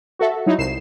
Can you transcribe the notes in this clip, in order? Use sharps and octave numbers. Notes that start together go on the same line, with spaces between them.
F#4 A4 E5
F#3 D#4 E4
C2 C7 E7